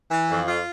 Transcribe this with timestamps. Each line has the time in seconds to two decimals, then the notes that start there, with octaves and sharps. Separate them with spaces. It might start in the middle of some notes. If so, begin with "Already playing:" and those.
0.10 E3
0.29 F2
0.47 F4